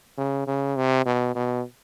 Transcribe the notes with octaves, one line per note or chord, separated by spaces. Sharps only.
C#3
C#3
C3
B2
B2